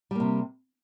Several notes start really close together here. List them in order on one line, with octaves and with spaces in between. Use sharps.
G3 A#3 C3